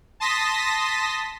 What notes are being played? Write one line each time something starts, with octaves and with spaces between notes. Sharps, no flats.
A5 C6 D#6 A#6 B6